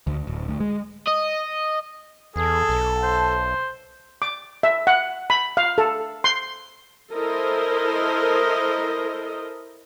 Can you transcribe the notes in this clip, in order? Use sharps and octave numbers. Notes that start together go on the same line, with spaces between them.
D2
D1
D2
G#3
D#5
E2 G#4 A4
B1
C5
D6
E5
F#5
B5
F5
A4
C6
E4 A4 A#4 C5 D#5